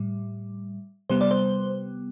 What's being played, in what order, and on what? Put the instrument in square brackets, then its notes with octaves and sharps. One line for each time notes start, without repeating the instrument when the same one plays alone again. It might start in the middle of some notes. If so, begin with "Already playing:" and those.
Already playing: [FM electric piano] A2 G3
C3 G3 B3 C5
D5
C5